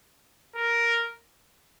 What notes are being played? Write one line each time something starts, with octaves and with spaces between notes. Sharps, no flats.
A#4